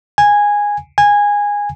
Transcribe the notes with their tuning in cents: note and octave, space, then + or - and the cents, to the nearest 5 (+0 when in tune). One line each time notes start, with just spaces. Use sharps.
G#5 -10
G#5 -15